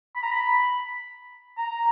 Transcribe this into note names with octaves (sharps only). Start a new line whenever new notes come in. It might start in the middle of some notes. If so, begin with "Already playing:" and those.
B5
A#5
B5
A#5